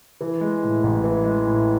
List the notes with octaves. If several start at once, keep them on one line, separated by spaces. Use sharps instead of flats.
E3
G#3
A2
A1
E3
G#3
A2